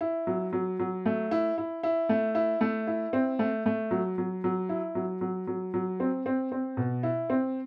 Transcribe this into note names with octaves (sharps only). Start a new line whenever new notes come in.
E4
F#3
F#3
F#3
A3
E4
E4
E4
A3
E4
A3
E4
C4
A3
A3
F#3
F#3
F#3
E4
F#3
F#3
F#3
F#3
C4
C4
C4
B2
E4
C4